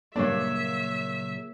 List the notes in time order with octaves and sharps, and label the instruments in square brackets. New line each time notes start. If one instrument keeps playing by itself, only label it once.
[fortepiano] G2 D4 [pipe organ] A#2 C#3 F#3 [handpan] A#3 C#5 [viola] E5